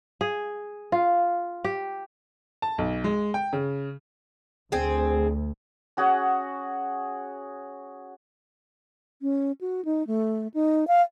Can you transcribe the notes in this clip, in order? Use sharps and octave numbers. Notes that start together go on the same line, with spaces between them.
G#4
F4
G4
A5
B1
G#3
G5
C#3
D2 C4 G#4
C#4 F#4 G#4 F#5
C#4
F#4
D#4
A3
D#4
F5